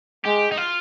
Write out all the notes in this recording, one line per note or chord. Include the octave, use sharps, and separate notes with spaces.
G#3 G4
D#4
F4